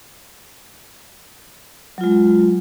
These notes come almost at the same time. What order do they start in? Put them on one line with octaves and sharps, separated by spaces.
F#3 F4 G#3